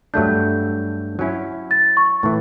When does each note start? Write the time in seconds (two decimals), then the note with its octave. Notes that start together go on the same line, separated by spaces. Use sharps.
0.14 G2 F#3 A3 D4 G6
1.19 F#3 C#4 E4
1.71 A6
1.97 C#6
2.23 A2 E3